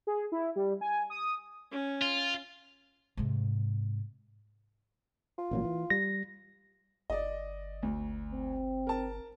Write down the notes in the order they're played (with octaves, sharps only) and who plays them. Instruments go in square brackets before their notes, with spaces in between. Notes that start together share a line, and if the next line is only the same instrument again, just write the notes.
[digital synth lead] G#4
E4
G3
G#5
D#6
[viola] C#4
[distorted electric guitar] F4
[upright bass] G#2 C3
[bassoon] F4
[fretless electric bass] A1 A#2 F#3
E3
[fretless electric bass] G3 [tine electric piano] A#6
[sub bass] G1 [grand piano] D5 D#5
[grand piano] D2
[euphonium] C4
[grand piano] A#4 A5